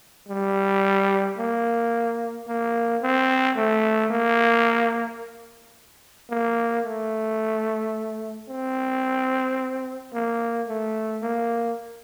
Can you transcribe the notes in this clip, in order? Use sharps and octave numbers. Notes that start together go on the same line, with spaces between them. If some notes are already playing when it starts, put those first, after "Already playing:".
G3
A#3
A#3
C4
A3
A#3
A#3
A3
C4
A#3
A3
A#3